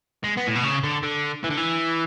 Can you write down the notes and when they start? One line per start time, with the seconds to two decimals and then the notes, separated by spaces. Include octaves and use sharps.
0.24 G#3
0.37 B3
0.47 A2
0.56 B2
0.64 C#3
0.84 D3
1.03 D3
1.44 E3
1.50 D3
1.57 E3